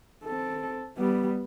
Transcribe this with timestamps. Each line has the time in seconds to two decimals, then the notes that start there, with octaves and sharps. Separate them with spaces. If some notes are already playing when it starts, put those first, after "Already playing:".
0.24 C4 A4
0.98 G3 B3